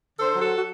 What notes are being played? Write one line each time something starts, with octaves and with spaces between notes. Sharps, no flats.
D3 A4 C5
F#3
F#4 A4
F#4